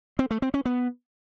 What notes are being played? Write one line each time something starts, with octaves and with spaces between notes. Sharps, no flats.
C4
A3
C4
C#4
B3